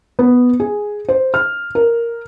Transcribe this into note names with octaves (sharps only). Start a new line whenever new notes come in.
B3
G#4
C5
F6
A#4